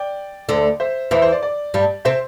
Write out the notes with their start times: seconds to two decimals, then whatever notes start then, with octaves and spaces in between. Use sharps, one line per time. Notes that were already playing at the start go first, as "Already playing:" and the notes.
Already playing: D5 G5
0.49 D2 D3
0.80 C5 E5
1.11 E2 E3 C5 E5
1.22 C5
1.32 D5
1.43 D5
1.74 G2 G3
2.05 C3 C4 C5 E5